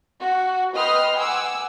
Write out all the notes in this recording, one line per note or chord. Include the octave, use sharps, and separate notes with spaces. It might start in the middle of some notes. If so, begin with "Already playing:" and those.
F#4
B4 D#5 G5 C6 D#6 F6
F#5 G#5 D6 E6